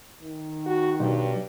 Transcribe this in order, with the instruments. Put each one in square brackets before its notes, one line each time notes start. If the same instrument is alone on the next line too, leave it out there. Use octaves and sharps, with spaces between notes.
[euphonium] D#3
[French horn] F#4
[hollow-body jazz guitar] B1 [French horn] G2